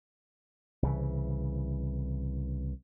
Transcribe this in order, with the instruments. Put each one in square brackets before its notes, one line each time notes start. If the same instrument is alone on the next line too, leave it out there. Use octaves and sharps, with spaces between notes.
[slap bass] C2 C#3 E3